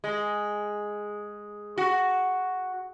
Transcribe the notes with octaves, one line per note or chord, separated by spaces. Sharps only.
G#3
F#4